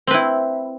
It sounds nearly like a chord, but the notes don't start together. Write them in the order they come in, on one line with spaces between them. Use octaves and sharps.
C4 B4 E4